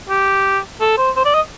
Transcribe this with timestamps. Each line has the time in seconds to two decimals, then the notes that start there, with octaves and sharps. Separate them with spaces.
0.09 G4
0.81 A4
0.98 C5
1.16 C5
1.25 D5
1.34 D#5